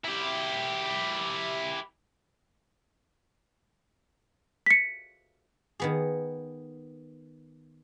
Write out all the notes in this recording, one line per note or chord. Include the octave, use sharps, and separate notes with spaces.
E4 G4
B6 C#7
D#3 B3 G#4